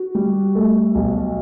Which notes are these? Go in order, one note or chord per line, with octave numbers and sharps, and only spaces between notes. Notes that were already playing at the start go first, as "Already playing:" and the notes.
Already playing: F#4
G3
A3
B1